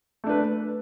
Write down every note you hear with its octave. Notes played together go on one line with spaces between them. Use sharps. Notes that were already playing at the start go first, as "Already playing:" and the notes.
A3 D4 B4